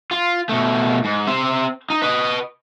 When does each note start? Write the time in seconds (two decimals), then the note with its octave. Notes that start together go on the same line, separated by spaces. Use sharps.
0.11 F4
0.49 B2 A3
1.04 G#2
1.27 C4 E5
1.90 D#4
2.02 B4 D#5